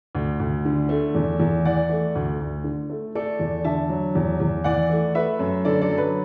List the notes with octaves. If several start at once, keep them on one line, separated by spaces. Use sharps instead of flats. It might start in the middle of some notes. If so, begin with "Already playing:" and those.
D2
D2
D3
A3
E2
E2
E3 D5 F#5
A3
D2
D2
D3
A3
A3 A4 D5
E2
D3 E5 A5
F#3
E2
E2
E3 D5 F#5
A3
A3 B4 E5
F#2
D3 A4 D5
A4 D5
F#3
B4